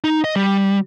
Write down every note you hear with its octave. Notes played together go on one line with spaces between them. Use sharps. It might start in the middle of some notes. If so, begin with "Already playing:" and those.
D#4
D#5
G3